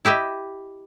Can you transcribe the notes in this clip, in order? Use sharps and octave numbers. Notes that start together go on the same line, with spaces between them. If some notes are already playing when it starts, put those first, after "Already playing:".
E4 G4 D#5 E5